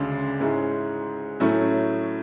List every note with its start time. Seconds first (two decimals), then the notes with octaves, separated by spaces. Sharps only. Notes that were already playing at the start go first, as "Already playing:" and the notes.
Already playing: D2 C#3 G#3 D4
0.40 G#2 G#3 C#4 E4
1.40 A2 F#3 A3 C#4 E4